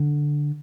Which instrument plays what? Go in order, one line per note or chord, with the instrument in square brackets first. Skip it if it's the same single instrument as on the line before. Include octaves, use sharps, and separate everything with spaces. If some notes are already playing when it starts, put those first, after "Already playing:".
Already playing: [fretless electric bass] D3